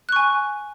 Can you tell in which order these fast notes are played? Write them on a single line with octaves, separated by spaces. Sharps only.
F#6 C#6 G#5